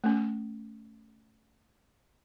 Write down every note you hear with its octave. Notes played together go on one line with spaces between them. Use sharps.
A3 C#4